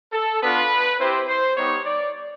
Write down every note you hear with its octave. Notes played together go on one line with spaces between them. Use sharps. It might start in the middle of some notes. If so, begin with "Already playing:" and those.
A4
B3 D4 F4 B4
C4 E4 G4 C5
C5
G3 B3 D#4 G4 C#5
D5